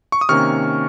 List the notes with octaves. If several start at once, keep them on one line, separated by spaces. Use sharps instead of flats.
C#6
D#6
C3 D#3 A#3 C#4 C#6 F6